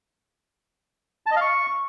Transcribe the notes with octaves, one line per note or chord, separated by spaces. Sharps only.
A5
D#5
F5
C#6